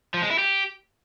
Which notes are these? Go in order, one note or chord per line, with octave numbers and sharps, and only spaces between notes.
F3
G#3
E4
G4